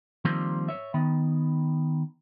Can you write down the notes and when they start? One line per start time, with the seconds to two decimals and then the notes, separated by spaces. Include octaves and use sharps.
0.25 D#3 F3 G3 A#3 C4
0.69 C#5 E5
0.94 D#3 B3